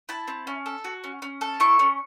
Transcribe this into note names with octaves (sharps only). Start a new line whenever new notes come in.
E4 A5
C4
C#4
A4
F#4
C#4
C#4
A4
E4 C#6
C#4